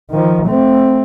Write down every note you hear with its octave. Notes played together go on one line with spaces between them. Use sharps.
D#3 F3
A3 C4